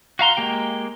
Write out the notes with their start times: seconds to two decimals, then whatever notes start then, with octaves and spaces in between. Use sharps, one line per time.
0.19 F#4 F5 A#5 C6
0.37 G#3 A#3 G4 G5